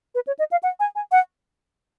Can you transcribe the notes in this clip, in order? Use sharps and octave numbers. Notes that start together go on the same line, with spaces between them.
B4
C#5
D#5
F5
F#5
G#5
G#5
F#5